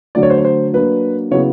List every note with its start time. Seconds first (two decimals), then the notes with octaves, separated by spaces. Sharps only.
0.15 D3 F#3 A3 D5
0.23 C#5
0.30 C5
0.38 C#5
0.44 C5
0.73 F#3 A#3 D4 B4
1.31 C#3 F#3 B3 E4 C#5